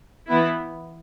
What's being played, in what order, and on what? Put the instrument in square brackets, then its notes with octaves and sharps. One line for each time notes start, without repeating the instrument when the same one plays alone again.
[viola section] E3 B3 E4